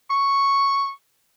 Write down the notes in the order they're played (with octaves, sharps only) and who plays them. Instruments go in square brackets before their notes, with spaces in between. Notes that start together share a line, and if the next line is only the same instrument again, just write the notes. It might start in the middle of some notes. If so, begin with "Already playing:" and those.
[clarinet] C#6